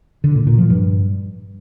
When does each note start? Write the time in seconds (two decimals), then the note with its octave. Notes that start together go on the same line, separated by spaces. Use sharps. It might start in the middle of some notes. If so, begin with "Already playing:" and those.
0.24 D3
0.35 A#2
0.47 A#2
0.58 F3
0.70 G2